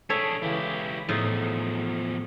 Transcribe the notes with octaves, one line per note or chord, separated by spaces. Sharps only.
D4 G#4 A4 C#5 E5
C#2 C#3 E3 E4 G4
E2 A2 F3 D#4 F4 G#4 A5